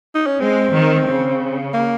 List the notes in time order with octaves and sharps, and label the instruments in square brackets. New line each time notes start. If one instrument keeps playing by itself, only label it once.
[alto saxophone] D#4
C#4
[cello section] G#3 [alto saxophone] C4
[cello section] D#3
C#3
[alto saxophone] A#3